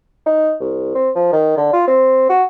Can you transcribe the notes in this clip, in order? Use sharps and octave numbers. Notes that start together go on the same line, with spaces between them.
D#4
C2
C4
F3
D#3
D3
F4
C4
F#4